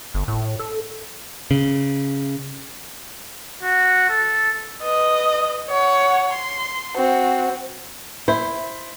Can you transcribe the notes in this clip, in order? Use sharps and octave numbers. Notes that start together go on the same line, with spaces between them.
G1
A2
A4
C#3
F#4
A4
B4 D#5
C#5 F#5
C6
C4 F#4
E4 C5 B5